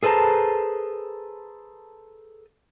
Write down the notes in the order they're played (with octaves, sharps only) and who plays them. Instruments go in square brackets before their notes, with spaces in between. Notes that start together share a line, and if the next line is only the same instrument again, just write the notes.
[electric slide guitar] G#4 A4 B4 C5 A5 A#5